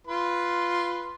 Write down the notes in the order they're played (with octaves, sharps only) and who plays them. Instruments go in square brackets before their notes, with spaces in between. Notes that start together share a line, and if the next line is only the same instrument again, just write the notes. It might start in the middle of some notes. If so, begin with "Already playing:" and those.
[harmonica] F4 B4 C6